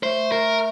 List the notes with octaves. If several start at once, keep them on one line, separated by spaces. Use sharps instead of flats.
A3 C5
A#4